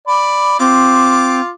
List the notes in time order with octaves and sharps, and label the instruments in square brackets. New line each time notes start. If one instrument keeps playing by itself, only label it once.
[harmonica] D5 B5
[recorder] C4 [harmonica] F4 D6